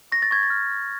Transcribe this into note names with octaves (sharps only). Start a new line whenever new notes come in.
C#6 A#6
A6
C#6 G#6
A6
F6
F6